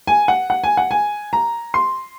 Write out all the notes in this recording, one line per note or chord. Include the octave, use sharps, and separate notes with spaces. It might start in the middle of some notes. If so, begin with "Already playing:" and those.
G#5
F#5
F#5
G#5
F#5
G#5
A#5
C6